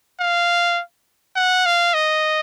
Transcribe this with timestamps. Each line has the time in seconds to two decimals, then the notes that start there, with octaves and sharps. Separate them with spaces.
0.20 F5
1.36 F#5
1.66 F5
1.94 D#5